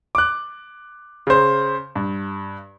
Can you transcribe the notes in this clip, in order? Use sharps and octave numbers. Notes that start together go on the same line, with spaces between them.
D6 F#6
C#3 C5
G2